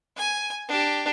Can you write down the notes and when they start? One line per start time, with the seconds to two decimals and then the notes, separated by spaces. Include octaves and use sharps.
0.18 G#5
0.68 D4 G4